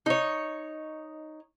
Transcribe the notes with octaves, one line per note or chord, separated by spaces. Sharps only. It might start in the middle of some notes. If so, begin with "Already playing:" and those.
D#4 C#5